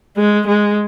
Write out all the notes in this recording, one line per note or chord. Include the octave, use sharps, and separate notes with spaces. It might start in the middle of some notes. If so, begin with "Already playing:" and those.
G#3
G#3